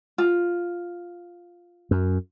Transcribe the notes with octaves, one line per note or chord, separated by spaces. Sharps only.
F4
F#2